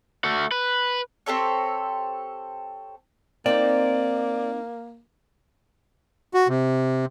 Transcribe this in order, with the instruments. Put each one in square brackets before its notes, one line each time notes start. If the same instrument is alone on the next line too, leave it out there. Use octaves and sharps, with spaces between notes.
[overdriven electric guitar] A3 F#4
B4
[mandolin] C4 G4 A4 C#5
[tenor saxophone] A#3 [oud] C4 D#4 [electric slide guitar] D5
[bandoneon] F#4
C3